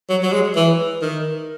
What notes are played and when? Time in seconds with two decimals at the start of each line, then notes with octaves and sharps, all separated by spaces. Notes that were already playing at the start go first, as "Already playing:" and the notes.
0.09 F#3
0.23 F#3
0.33 G#3
0.56 E3
1.02 D#3